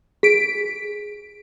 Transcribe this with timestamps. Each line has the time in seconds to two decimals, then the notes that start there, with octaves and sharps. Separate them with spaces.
0.23 G#4 B6 D7